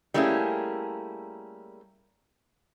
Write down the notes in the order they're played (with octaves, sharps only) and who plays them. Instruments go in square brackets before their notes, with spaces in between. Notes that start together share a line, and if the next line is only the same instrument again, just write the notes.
[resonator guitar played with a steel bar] G3 A3 A#3 C#4 E4 G#4